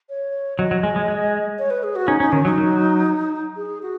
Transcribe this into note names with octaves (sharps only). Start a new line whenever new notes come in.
C#5
F#3 D#5
F#3
G#3
G#3
G#3
C#5
B4
G#4
F#4
C#4 D#4
C#4 D#4
D#3 C#4
F#3 D#4
F#3
G#4
F#4